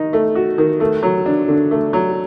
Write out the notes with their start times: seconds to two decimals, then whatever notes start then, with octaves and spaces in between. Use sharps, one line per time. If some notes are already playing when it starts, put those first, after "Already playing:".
Already playing: D#3 D#4
0.13 A3
0.35 F#4
0.58 D#3
0.80 A3
1.03 F#3
1.26 D4
1.48 D3
1.71 A3
1.93 F#3